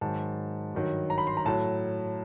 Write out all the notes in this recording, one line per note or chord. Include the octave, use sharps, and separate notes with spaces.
G#2 D#3 F#3 A5
G2 D#3 F#3
A#5
B5
C6
A#5
A2 F#3 A5